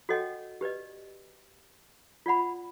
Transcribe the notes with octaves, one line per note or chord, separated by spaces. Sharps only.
F#4 A4 C#5 D#5 F#5 G5
G4 B4 D5 D#5
F4 D5 F#5 B5